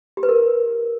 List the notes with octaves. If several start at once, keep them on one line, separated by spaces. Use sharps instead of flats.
G4
B4
A#4